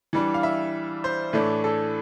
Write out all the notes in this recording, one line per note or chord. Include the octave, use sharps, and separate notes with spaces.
E3 G3 D4
F5
E5
C5
A2 E3 A3 D4
A4